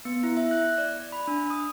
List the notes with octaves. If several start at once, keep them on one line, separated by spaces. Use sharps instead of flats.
B3
E4
E5
F#6
D5
B5
D4
D#6